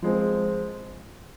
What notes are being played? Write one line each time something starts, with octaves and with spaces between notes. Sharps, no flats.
F3 G#3 C4